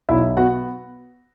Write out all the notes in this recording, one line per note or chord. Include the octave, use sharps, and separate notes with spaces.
B1 E4 E5
B3 F#4 F#5